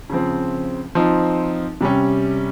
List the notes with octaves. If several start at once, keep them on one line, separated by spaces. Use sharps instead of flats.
C#3 F3 C4
F3 C4 D#4
C3 G3 C#4